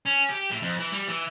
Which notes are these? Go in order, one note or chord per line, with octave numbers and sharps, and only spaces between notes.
C#4
G4
A2
F2
E3
G3
E3